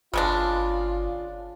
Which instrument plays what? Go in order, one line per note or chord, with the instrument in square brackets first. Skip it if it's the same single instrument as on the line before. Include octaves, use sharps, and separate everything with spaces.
[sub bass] G1 [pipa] C#3 G#3 D4 [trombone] F4